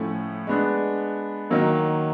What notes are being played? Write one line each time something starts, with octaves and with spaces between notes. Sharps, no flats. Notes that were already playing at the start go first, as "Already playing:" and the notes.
Already playing: A2 F3 A3 C#4 E4
G#3 B3 D4
D#3 F#3 A#3